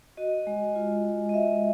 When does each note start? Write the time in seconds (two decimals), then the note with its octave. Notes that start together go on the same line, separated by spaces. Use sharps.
0.17 F#4 D#5
0.47 G#3
0.76 F4
1.05 G#3
1.29 D#5
1.34 F#4 E5